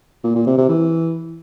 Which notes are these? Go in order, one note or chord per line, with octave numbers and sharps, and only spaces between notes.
A#2
A#2
C3
C3
E3